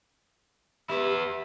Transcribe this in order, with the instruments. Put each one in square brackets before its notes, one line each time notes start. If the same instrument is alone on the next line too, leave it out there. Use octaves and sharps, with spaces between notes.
[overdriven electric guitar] B3 E4 [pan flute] G4